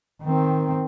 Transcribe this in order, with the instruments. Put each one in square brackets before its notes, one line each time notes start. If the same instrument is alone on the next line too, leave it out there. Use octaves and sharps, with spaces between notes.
[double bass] D#3 C4